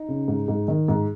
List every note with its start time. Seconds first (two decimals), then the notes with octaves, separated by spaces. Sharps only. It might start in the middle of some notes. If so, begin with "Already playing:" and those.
Already playing: D#4
0.08 C#3
0.28 G#2
0.48 G#2
0.68 D#3
0.88 G#2